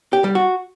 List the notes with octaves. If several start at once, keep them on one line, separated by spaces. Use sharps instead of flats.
G4
G3
F#4